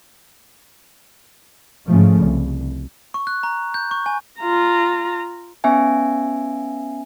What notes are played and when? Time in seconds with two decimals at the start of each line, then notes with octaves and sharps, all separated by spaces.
1.86 G#2 C#3 F3 A3
2.21 C2
3.14 C#6
3.27 F#6
3.43 A#5
3.74 G6
3.91 C#6
4.06 G#5
4.40 F4 A#5
5.64 B3 C#4 E5 G#5